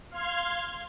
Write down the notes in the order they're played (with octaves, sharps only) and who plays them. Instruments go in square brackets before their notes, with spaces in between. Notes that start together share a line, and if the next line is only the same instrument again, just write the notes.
[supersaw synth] F5 C6 F6 G#6